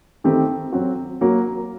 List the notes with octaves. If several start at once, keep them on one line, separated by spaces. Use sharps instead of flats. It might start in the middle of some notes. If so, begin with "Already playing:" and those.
D#3 A3 C4 G4
F#3 C4 F#4
F#3 A#3 F#4